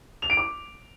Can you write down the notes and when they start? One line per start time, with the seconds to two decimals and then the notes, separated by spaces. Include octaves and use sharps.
0.22 F7
0.30 D7
0.37 D6